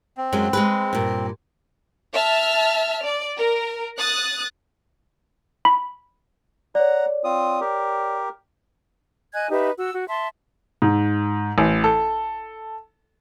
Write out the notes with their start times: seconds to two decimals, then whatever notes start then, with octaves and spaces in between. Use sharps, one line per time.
0.17 C4
0.33 F#2 F#3 G#3
0.53 G#3 G#4 B4
0.93 G2 A#2
2.13 E5 A5 F6
3.03 D5
3.37 A#4
3.97 D#6 F#6 A6
5.65 B5
6.75 C#5 D5 F#5 A#5
7.24 C4 F4 D#6
7.61 G4 A#4
9.33 D#5 G#5 F#6 G#6
9.51 D#4 G4 B4 E5
9.76 F#4 E6
9.93 F#4
10.08 E5 A5 C6
10.82 G#2
11.58 A1
11.84 A4